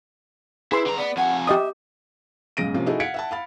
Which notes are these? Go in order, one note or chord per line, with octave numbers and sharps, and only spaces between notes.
E4 G#4 B4 C6
D3 A#5
B3 D5
F2 F#5 G#5
G4 D#5 E5 D#6
B1 G#2 C#3 A#6 D7 D#7
C3 F3 A#3 C#4
D#4 E4 F#4 G#4 A4
F5 F#5 G#6 B6 C#7 D7
E5 F#5 A5
F5 B5 A6